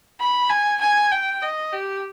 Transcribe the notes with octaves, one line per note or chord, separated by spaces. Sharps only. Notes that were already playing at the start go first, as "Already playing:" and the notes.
B5
G#5
G#5
G5
D#5
G4